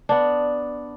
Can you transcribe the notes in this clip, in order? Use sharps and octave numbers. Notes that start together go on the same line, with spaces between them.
B3 D4